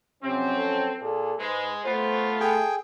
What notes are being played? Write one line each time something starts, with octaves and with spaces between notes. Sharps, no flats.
F2 C3 F#3 C4 C#4
A4
A#2 G#4 A4
G#2 G#3 B4
A3 B3 F4 C5
G#4 A4 G5